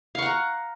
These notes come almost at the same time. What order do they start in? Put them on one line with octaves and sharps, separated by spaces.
F5 C#6 F#5 A#5